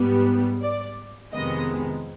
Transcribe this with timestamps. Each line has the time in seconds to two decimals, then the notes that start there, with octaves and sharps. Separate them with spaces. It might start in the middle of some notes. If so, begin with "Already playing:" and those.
Already playing: G#2 G3 B3
0.62 D5
1.33 F2 C3 D#3 G#3 B3 D#5